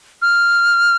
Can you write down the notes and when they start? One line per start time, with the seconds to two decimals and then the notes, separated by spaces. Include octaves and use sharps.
0.22 F6